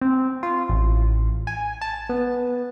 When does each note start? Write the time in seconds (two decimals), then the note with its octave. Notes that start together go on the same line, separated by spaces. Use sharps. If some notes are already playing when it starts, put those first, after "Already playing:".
0.01 C4
0.43 F4
0.69 A1
1.47 G#5
1.81 A5
2.09 B3